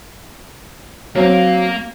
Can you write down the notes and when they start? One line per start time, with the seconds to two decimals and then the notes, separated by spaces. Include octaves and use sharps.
1.15 F#3 A#3 C4 F5